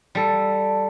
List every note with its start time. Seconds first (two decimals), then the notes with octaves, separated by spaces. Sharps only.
0.15 G3 A4